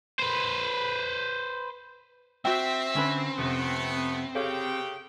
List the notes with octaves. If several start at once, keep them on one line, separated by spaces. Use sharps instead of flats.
B4 C5
C4 F#4 E5 G5
D3 C#4 B4
F2 C3 A3 B3
C#3 G4 A4 C#5 F5 G5